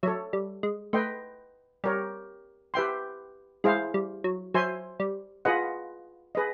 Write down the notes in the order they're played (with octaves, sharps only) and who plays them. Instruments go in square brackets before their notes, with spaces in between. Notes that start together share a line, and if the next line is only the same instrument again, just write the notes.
[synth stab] F#3 [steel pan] A4 C#5 E5
[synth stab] G3
G#3
[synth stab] A3 [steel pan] B4 D#5 G5 C6
[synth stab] G3 [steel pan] G4 A#4 C#5
[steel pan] G4 B4 E5 G5 C6
[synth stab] G#3 [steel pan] E4 G#4 C5 F5
[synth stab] G3
F#3
[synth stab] F#3 [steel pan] C5 E5 G#5 C6
[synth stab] G3
[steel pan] F4 G#4 B4 D#5 F#5
G#4 B4 D#5